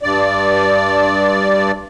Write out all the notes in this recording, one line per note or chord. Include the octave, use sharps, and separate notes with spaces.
G2 D5